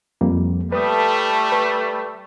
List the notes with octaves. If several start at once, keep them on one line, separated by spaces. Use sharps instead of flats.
F2 G3 A#3
G3 A3 B4 D#6
B4